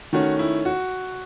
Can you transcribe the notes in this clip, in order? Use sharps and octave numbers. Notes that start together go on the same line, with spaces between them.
D#3 A3 C#4 F#4
E4
F#4